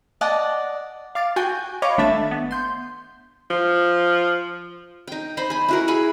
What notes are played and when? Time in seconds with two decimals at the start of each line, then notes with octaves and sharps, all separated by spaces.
0.21 D5 D#5 F#5 A5
1.15 F5 D6 A6
1.36 F#4 G5 G#5 G6
1.82 C#5 D#5 F5 B5 C#6 D6
1.98 G#1 A3 D4 E5 A6
2.31 B3
2.51 C6 G6
3.50 F3
5.07 D#4 G5
5.37 D#4 C5 B5
5.50 G#5 B5
5.68 E4 F#4 A#4
5.88 E4 G#4 G#5 B5